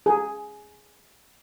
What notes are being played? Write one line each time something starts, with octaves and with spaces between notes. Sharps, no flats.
G#4